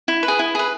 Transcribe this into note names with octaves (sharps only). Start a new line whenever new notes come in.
E4
B4
G#4
E4
G#4 B4